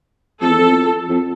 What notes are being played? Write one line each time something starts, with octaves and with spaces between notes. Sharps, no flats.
F2 A4
E2
F2
F2